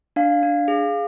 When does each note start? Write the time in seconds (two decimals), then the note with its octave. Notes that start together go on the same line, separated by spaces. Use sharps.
0.16 D4 F5
0.43 D4
0.68 G#4